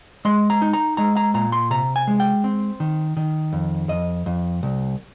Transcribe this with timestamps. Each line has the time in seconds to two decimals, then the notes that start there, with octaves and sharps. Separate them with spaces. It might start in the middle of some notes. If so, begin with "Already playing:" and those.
0.25 G#3 C6
0.50 A#5
0.62 D#4
0.73 A#5
0.97 G#3 A#5
1.17 A#5
1.34 A#2 A#5
1.52 C6
1.71 C3 A#5
1.96 G#5
2.07 G#3
2.20 G5
2.44 C4
2.80 D#3
3.17 D#3
3.53 F2
3.89 F2 D#5
4.26 F2
4.63 C2